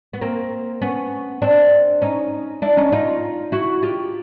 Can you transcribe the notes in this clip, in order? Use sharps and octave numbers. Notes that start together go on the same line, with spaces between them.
B3
A#3 C4
B3 C#4
C4 D4
C#4 D#4
D4 E4
C#4 D#4
D#4 F4
E4 F#4
F4 G4